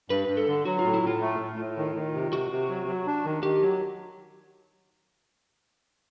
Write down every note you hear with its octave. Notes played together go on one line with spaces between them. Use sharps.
G2 B4
G2
A4
D3
F#3 F#4
A2 F4
E4
A2 F4
A3
A2
A2
D#3
D#3
C3
C3 F#4
C3
F#3
F#3
D4
D#3
D#3 G4
F#3